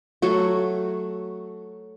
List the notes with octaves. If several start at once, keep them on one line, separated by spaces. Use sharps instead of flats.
F#3 A3 F#4